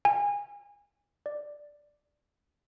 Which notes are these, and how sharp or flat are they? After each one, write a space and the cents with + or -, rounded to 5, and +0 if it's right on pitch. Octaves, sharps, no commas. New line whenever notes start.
G#5 -30
D5 +0